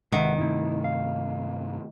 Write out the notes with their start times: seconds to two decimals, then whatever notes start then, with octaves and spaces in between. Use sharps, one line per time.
0.12 G1 C3 D#3 G#3 B4 E5 F#5
0.38 G2 C3 A3 D#4 E4
0.84 F5